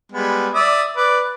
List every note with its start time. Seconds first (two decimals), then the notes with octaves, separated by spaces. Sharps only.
0.12 G3 G#3 B3
0.54 D5 E5 D#6
0.96 B4 D5 D6